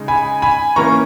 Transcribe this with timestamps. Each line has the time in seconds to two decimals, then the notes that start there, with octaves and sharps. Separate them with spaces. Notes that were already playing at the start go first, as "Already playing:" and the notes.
Already playing: C#3 G#3 D#4
0.08 G#5 B5
0.42 G#5 B5
0.76 E3 A#3 C#4 A#5 C#6